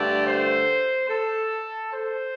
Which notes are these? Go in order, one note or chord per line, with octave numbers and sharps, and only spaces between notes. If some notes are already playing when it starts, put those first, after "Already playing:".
Already playing: G2 D3 A3 D5
C5
A4
C5